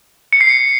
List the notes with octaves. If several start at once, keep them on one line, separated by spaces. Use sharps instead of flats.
C#7
C7
C#7